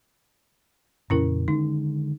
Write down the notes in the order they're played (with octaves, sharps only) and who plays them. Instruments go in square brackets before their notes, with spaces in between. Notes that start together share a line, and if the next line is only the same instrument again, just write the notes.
[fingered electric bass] F2 A#2 C#3 [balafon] C#4 E4 A#4
[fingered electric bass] D3 D#3 G#3 [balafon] D#4